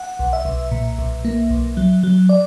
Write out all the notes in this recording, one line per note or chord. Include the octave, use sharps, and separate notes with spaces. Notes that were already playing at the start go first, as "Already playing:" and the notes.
Already playing: F#5
B1
E5
B1
A#2
B1
A#3
B1
F#3
F#3
D5